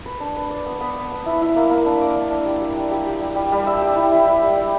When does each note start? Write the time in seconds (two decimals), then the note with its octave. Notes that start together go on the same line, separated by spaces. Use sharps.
0.06 B4
0.20 D4
0.37 B4
0.50 D5
0.66 B3
0.81 B3
0.96 B3
1.12 B3
1.26 E4
1.42 E4
1.56 A#3
1.71 A#3
1.86 D4
2.01 D5
2.16 D4
2.31 D4
2.46 G3
2.61 G3
2.76 G3
2.91 G4
3.07 G4
3.21 G3
3.36 G3
3.52 G3
3.67 E5
3.82 G4
3.96 E4
4.12 E4
4.27 G3
4.42 G3
4.57 G3